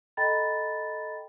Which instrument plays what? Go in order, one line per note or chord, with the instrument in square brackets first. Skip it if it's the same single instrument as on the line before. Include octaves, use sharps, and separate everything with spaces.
[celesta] A4 D#5 G5 A#5 B5 A6